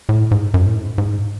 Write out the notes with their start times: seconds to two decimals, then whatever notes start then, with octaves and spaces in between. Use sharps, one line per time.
0.09 A2
0.31 G#2
0.54 F#2
0.66 A2
0.75 G#2
0.98 G#2